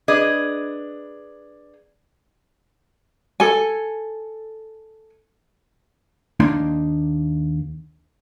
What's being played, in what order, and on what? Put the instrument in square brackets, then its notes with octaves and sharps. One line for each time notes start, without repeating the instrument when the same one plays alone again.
[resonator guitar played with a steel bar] D4 G#4 B4 D#5
[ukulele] A4 G#5
[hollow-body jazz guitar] D#2 A#3 D4 D#4 C6